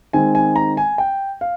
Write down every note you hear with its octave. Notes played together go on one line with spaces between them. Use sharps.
D#3 G#3 C4 D#4 G#5
G#5
A#5
G#5
G5
F5